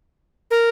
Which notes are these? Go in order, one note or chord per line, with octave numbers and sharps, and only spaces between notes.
A#4